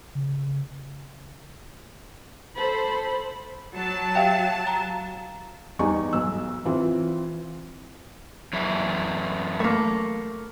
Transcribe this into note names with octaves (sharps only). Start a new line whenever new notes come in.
C#3
A4 C5 B5
F#3 A5
G4 E5 F5 G5
A#5
E2 G3 D#4 G#5 C#6
B1 E6
E3 C4 F4
F#2 E3 E4
A3 A#3